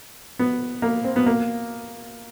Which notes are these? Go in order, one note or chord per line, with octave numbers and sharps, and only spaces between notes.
B3
A#3
C4
B3
A#3